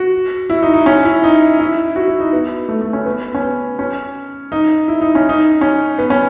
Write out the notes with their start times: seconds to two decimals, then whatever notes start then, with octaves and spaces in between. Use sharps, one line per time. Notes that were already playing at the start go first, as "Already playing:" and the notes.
Already playing: F#4
0.50 E4
0.62 D#4
0.74 D#4
0.86 C#4
1.05 E4
1.24 D#4
1.60 E4
1.96 F#4
2.08 E4
2.20 D#4
2.33 B3
2.69 A3
2.82 A3
2.93 C#4
3.06 B3
3.35 C#4
3.42 B3
3.79 C#4
4.52 D#4
4.88 E4
5.01 D#4
5.15 C#4
5.29 D#4
5.61 C#4
5.98 B3
6.10 C#4